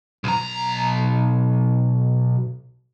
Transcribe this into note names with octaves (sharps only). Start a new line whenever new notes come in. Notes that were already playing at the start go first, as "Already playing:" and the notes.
B1 A#5